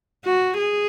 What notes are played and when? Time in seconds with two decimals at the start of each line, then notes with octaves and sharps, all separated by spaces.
0.25 F#4
0.58 G#4